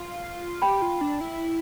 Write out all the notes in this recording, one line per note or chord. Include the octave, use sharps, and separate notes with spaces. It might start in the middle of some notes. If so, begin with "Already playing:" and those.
Already playing: F4
G4 G5 B5
F4
D4
E4